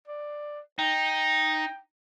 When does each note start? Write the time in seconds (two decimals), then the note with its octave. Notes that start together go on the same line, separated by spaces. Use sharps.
0.07 D5
0.79 D#4 G5